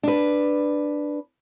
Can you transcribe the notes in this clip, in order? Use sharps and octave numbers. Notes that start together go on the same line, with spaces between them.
D4 B4